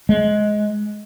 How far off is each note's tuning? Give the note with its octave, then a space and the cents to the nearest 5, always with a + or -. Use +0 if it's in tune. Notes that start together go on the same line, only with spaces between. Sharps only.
G#3 +15